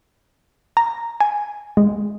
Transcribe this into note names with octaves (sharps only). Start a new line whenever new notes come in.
A#5
G#5
G#3